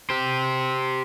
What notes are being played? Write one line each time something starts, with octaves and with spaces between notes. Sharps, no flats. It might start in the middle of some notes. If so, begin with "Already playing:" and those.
G4 C5